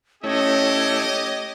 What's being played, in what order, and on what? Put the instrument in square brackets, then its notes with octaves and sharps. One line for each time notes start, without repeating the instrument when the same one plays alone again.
[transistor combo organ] A3 E4 [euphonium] C#4 [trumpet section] G4 D#5 [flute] C#5